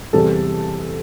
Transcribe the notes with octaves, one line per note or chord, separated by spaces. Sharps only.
E2 C3 G3 A4